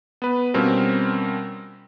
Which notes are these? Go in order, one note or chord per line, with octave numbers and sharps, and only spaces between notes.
B3 B4
B2 G3 C4 C#4 F4 A#4